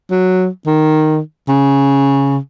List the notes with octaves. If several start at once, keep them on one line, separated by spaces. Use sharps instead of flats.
F#3
D#3
C#3